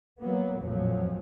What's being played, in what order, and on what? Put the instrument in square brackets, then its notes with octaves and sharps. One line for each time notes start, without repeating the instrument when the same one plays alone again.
[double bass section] F#3 A#3 B3
A1 F2 A#2 F3 F#3